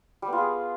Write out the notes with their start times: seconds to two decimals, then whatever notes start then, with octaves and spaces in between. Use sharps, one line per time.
0.22 G3
0.28 B3
0.33 F4
0.38 G#4